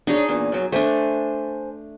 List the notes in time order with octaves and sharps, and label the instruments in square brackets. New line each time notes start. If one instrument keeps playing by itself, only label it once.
[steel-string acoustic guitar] D4 C#5 [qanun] D#4 G#4
[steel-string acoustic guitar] E2 A#2
F#2 F#3
[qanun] A3 D4 [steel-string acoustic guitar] C5 G#5